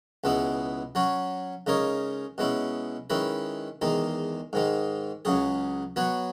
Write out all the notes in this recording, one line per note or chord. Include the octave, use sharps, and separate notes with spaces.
C#2 B2 G#3 B3 E4
F#3 C#4 F#4 C#5
C#3 G#3 D#4 A#4 C#5
B2 G#3 C#4 E4
D#3 G#3 C#4 E4 B4
E2 D#3 G#3 D#4
G#2 D#3 G#3
C#2 C#3 F#3 C#4 G#4
F#3 B3 F#4 C#5